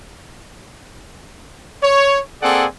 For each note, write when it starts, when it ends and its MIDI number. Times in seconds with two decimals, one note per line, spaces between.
1.82 2.19 73
2.42 2.65 58
2.42 2.65 60
2.42 2.65 68
2.42 2.65 69
2.42 2.65 74
2.42 2.65 78